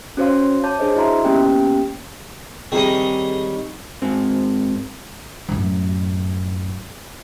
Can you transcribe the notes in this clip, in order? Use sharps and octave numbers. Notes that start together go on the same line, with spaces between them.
C#4 F#4 C5 C#5 F5 C6
C#5 A5 D6 G6
D4 G#4 C5 D#5
E4 F#4 D#5 E5 A#5 C6
A#3 B3 C#4 G4 G5
D#3 G3 C4 G#4 C#5 D#5
G#2 C4
F#2 A2